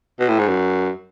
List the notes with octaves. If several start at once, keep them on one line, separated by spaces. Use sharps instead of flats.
B2
A2
G#2
F#2